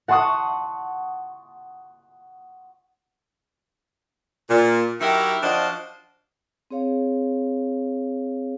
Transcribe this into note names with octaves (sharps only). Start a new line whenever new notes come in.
F#5 A5 C6 C#6 D#6 F#6
A#2
F#3 D#4 E4 G4 A#4 E5
F3 D4 F4 F#4 C5 D#5
C4 G#4 C#5 F5